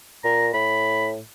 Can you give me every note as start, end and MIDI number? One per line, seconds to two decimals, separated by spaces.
0.24 0.52 46
0.24 0.48 82
0.54 1.21 45
0.54 1.07 83